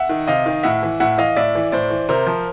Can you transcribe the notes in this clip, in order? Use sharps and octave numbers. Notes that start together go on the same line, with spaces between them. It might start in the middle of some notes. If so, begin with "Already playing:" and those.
Already playing: E5 F#5
D#3
C3 D#5 F5
D#3
A2 E5 F#5
E3
A2 E5 F#5
E3 D#5 F5
A2 D5 E5
E3
A2 C5 D5
E3
C3 A#4 C5
F3